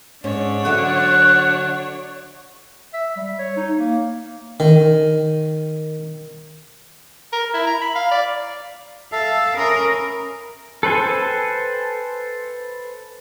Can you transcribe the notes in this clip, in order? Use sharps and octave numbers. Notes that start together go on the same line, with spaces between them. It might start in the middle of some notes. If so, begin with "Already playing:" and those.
G#2 C#4 D4 C#5
D3 F#3 E5 F#5
E5
G3
C#5
D#4
A#3
D#3
A#4
E4
A#5
B5
F5
D5
A4 E5 F5 A5
C#4 A#4 B5 D#6
A4 B4 C5 G5 G#5